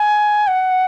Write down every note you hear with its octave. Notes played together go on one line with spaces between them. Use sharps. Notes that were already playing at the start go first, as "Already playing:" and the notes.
Already playing: G#5
F#5